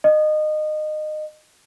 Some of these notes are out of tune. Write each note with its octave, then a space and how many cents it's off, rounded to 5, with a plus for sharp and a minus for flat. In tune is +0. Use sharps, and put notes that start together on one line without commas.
D#5 -25